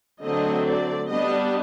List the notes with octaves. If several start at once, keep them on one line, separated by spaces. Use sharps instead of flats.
D3 F#3 A3 C4 D#5
D5
G3 B3 D4 D#5